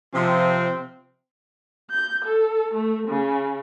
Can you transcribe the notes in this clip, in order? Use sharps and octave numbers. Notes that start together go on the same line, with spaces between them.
C3 F3 C4
G6
A4
A3
C#3